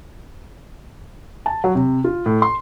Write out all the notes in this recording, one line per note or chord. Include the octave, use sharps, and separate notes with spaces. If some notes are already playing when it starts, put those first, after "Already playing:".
A5
F#3
C3
F4
A2
C6